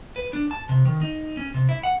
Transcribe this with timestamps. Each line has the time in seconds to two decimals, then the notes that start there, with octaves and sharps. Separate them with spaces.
0.16 B4
0.33 D4
0.51 A5
0.69 C3
0.85 D#3
1.01 D#4
1.37 C#4
1.54 C3
1.69 E4
1.83 F#5